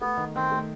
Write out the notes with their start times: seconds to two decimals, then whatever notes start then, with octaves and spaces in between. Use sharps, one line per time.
0.01 A3 B3
0.17 D#3
0.35 D#3 C4
0.52 A3